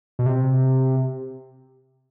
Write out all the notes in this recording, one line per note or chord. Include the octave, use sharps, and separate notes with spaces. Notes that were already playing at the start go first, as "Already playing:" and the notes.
B2
C3